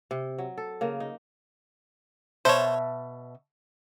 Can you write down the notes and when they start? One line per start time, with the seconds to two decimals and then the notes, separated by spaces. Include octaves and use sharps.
0.11 C3
0.38 F#3
0.58 A4
0.81 C#3 A#3
1.00 D#4
2.45 B2 C5 C#5 E5 A5